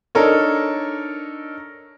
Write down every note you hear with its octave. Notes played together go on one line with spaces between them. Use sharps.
D4 D#4 A4 A#4 C#5